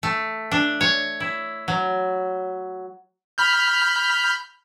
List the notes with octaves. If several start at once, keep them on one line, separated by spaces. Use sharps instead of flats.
A3
D4
C#5
E4
F#3
B5 F6 G6